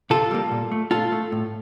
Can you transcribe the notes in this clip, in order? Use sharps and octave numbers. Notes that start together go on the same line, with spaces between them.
C3 F4 A4
G3 A#3
A#2
A3
A#2 F4 A4
A3
A2